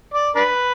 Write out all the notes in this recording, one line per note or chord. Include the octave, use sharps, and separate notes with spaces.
D5
D4 B4